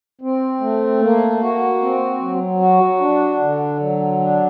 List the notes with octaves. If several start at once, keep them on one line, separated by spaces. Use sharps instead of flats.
C4
A3
A#3
F#4
C4
F#3
F#4
D4
D3
F#3
D4